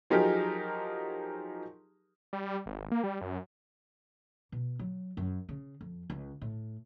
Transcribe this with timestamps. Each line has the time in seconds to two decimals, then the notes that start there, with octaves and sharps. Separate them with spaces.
0.10 F3 F#3 D#4 G4 G#4 A#4
2.33 G3
2.66 G#1
2.92 A#3
3.04 G3
3.21 F#2
4.52 B2
4.79 F#3
5.17 F#2
5.49 C#3
5.81 F2
6.10 C#2
6.42 A2